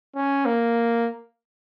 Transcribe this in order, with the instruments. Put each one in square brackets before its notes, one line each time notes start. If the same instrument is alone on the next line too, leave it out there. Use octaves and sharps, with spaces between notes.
[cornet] C#4
A#3